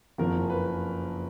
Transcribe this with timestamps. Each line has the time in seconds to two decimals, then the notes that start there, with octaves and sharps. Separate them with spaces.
0.18 F#1 F2 C#3 F3 A#4
0.50 B4